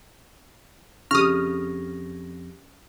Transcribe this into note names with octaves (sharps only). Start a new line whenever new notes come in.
F2 C#3 G4 C#6 D#6 F6 A#6